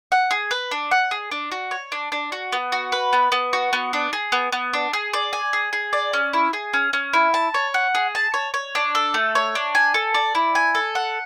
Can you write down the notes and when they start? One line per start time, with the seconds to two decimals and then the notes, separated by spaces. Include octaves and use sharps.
0.12 F#5
0.31 G#4
0.51 B4
0.71 D4
0.91 F#5
1.11 G#4
1.31 D4
1.52 F#4
1.71 C#5
1.92 D4
2.12 D4
2.32 F#4
2.52 B3
2.72 F#4
2.92 B4
3.13 B3
3.32 B3
3.53 F#4
3.73 B3
3.93 D4
4.13 G#4
4.32 B3
4.52 B3
4.73 D4
4.93 G#4
5.13 D5
5.33 G#5
5.53 G#4
5.73 G#4
5.93 D5
6.13 C#4
6.33 E4
6.53 G#4
6.73 C#4
6.93 C#4
7.13 E4
7.34 A5
7.54 C#5
7.74 F#5
7.95 G#4
8.15 A5
8.34 C#5
8.54 C#5
8.75 D4
8.95 A4
9.14 A3
9.35 C#5
9.55 D4
9.75 G#5
9.94 A4
10.14 D5
10.35 E4
10.55 G#5
10.75 A4
10.95 F#5